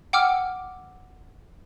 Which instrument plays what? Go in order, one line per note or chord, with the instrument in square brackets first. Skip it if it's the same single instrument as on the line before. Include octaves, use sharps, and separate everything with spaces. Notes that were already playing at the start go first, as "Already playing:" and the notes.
[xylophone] F#5 G5 D6 E6 F6